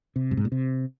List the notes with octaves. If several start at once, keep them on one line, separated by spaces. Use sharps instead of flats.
C3
G2
G#2
A#2
C3